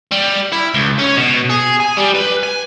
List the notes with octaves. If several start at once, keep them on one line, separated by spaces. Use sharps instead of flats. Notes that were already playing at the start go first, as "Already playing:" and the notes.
G3
E4
C#2
C#4
B2
G#4
G#5
G3
B4
G#5